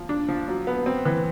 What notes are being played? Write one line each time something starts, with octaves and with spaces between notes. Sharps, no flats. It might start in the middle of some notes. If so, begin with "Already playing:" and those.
Already playing: F3
D4
F3
F#3
B3
C4
E3